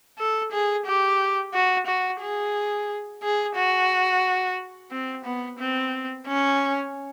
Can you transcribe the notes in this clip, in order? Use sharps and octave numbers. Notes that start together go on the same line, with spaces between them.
A4
G#4
G4
F#4
F#4
G#4
G#4
F#4
C4
B3
C4
C#4